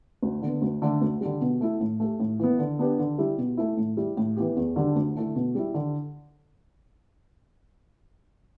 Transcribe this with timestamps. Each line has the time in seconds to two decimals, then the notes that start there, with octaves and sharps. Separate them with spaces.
0.23 D2
0.42 D3 B3
0.62 D2
0.82 D3 A3 D4
1.01 D2
1.21 D3 G3
1.41 B2
1.61 A3 E4
1.80 A2
2.00 A3 G4
2.20 A2
2.39 E3 B3
2.59 D3
2.79 B3 D4 G4
2.99 D3
3.18 G3 E4 G4
3.38 B2
3.57 A3 E4
3.77 A2
3.97 G3 E4 G4
4.17 A2
4.37 E3 B3 G4
4.56 E2
4.76 D3 G3 D4
4.96 D2
5.15 D3 A3 E4
5.35 B2
5.55 G3 E4
5.74 D3